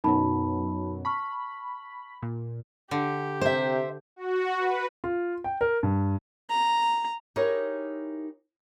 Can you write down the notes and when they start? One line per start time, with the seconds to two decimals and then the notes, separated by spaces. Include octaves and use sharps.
0.04 F#2 B2 F#3 D#4 A5 B5
1.05 A5 B5 C#6 F6
2.22 A#2
2.91 D3 G4
3.41 C3 C5 E5
4.16 F#4
4.58 B4
5.04 F4
5.44 G5
5.61 A#4
5.83 G2
6.49 A#5
7.36 D#4 E4 G4 G#4 A#4 C#5